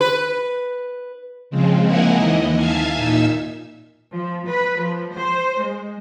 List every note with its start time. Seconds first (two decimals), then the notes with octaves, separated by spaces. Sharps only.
0.01 B4
1.50 C#3 F3 G#3 C4
1.84 A#3 D#4 E4 A#4 F#5 G#5
2.16 D#2 E3 D#5
2.56 E5 F5 G#5 A5 G#6
2.95 A#2 D#4 E5 E6
4.13 F3
4.47 B4
4.79 F3
5.15 C5
5.63 G#3